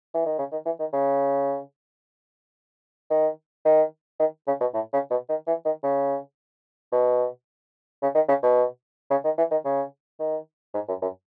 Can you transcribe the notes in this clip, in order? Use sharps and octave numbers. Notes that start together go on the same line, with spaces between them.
E3
D#3
C#3
D#3
E3
D#3
C#3
D#3
D#3
D#3
C#3
B2
A2
C#3
B2
D#3
E3
D#3
C#3
B2
C#3
D#3
C#3
B2
C#3
D#3
E3
D#3
C#3
D#3
G#2
F#2
F#2